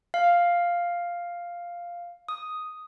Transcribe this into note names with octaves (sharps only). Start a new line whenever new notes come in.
F5
D#6